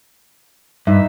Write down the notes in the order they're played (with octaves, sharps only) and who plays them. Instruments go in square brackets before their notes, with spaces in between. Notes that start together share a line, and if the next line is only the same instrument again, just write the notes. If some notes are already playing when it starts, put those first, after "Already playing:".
[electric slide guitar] G2 [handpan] D#4 E5